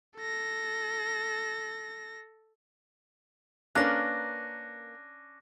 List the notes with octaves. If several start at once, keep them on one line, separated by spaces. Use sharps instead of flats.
A4 A#6
A#3 C#4 D4 A#4 B4 F#6 A#6